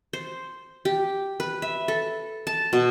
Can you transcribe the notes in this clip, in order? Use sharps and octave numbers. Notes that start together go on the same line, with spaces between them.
C5
G4
B4
E5
A4
A5
B2